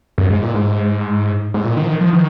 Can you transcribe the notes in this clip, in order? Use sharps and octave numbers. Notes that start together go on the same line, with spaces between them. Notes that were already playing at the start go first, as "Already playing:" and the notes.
F#2
G#2
A#2
G#2
G#2
A#2
D#3
F3
D#3
F3
D#3